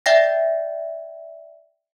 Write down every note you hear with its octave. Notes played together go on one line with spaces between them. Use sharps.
D5 E5 G5 A#6